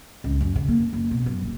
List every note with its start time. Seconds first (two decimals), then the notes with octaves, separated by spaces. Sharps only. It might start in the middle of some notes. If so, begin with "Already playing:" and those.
0.24 C#2
0.41 F#2
0.56 C#3
0.68 A#3
0.93 F#1
1.11 B2
1.26 F#2
1.42 D#1